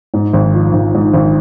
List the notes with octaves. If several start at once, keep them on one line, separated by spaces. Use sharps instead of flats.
G#2
G#1
F3
G#1
G#2
G#1